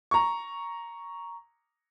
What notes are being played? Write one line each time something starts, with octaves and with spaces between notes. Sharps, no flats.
A#5 C#6